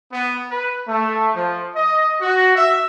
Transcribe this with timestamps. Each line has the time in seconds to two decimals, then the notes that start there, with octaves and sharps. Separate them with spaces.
0.13 B3
0.50 B4
0.89 A3
1.35 F3
1.76 D#5
2.20 F#4
2.56 E5